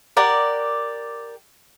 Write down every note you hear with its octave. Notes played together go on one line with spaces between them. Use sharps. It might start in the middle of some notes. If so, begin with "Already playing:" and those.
G4 A#4 D5 F#5